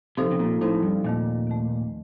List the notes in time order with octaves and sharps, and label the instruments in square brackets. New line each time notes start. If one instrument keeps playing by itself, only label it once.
[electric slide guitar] C3 [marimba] F3 C4 D#4 A4 C5
[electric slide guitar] C3
A#2
[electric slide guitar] A2 [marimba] F3 C4 D#4 A4 C5
[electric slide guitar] G2
[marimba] D#2 D#3 A3 [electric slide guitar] A#2
[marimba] D#2 D#3 A3